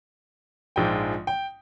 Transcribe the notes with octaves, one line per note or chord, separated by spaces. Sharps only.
A#1 G#2 F3 G#3 G5
G5